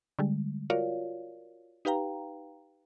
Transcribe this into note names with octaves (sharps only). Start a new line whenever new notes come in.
D3 G3 G#3
F4 F#4 A#4 C#5 D5 F5
D#4 G4 B4 F5 G5 A#5